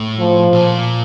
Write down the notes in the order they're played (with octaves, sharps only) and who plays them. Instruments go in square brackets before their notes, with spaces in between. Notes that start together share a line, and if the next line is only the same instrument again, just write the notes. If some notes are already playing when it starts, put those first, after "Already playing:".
Already playing: [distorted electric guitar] A2
[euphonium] F3
[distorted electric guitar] A#2